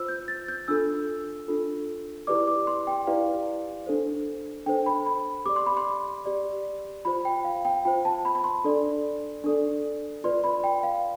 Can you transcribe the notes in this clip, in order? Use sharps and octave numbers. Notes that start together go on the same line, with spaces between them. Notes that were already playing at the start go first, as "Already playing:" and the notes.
Already playing: F4 C5 E6
G6
A6
G6
D4 F4 A4 E6
D4 F4 A4
E4 G4 B4 D5 D6
D6
C6
G5
E4 G4 B4 D5 F5
D4 A4 C5
D4 A4 C5 G5
B5
B5
G4 D5 D6
C6
B5
C6
G4 D5
F4 C5 B5
G5
F5
G5
F4 C5 G5
A5
B5
B5
C6
D4 A4 D5
D4 A4 D5
F4 B4 D5 C6
B5
G5
F5